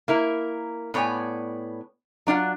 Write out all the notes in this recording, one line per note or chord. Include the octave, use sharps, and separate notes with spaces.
A#3 E4 A#4
A2 B3 C#5 D5 G#5
F#3 D4 F4 F#5